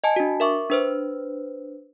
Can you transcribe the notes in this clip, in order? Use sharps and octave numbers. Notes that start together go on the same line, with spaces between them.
D#5 G#5 A5
D4 F#4
A#4 E5 C#6 D6
D4 B4 C5